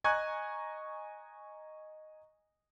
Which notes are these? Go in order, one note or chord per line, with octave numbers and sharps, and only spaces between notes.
D#5 G#5 A#5 C#6 F#6 G#6